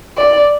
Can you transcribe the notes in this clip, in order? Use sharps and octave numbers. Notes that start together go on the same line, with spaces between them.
D5